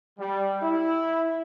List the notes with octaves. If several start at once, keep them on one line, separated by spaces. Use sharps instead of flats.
G3
E4